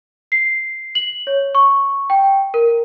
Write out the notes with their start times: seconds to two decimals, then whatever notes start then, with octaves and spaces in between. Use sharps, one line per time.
0.32 C7
0.95 F#7
1.27 C#5
1.55 C#6
2.10 G5
2.54 A#4